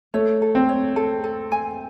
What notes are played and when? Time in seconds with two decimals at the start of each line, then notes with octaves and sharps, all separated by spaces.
0.14 A3 C#5
0.42 A4
0.55 C4
0.69 C#5
0.96 A4
1.24 A4
1.52 G#5